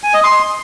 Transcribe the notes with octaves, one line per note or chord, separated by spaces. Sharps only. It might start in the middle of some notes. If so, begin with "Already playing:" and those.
G#5
D#5
C6